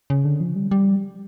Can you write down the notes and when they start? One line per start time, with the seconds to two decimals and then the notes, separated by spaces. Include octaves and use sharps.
0.10 C#3
0.25 D3
0.40 F3
0.56 G3
0.71 G3